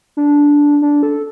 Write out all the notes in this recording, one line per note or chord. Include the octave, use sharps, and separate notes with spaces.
D4
D4
A4